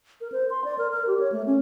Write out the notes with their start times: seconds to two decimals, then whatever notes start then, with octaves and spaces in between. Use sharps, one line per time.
0.21 A#4
0.32 C5
0.50 C6
0.64 D5
0.78 A#4
0.91 A#4
1.07 G4
1.20 C#5
1.32 A3
1.46 C#4